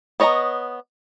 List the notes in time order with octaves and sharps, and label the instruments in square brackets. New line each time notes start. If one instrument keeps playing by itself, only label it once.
[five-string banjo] B3 C#5 D#5 F#5 A#5